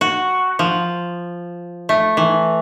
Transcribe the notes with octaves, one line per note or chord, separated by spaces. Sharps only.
F#4
F3
A3
E3